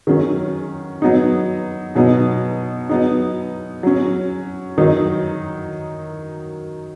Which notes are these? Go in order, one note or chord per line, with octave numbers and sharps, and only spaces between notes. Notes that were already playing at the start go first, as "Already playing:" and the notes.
D#3 F#3 C#4
F#3 B3 D#4
B2 F#3 B3 D#4
F#3 B3 D#4
F#3 C#4
D#3 F#3 D#4